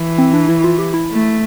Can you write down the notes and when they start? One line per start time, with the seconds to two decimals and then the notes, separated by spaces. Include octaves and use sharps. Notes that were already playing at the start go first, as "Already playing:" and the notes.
Already playing: E3
0.18 C4
0.33 D4
0.49 E4
0.64 F4
0.79 G4
0.94 E4
1.10 A3